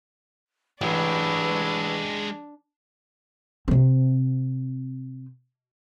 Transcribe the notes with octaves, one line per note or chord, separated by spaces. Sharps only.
A1 G#3 D4 G4 B4 C#6 E6
C3 C4